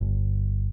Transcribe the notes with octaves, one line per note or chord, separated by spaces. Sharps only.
G1